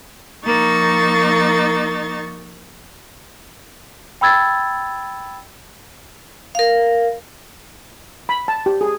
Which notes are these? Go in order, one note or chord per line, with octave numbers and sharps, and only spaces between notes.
F3 A#3 D#4 C#6 A6
G5 B5 E6 G#6 A6
A#4 F5
B5
A5
G4
G#4